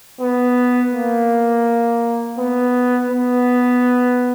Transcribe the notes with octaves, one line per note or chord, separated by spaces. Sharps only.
B3
A#3
B3
B3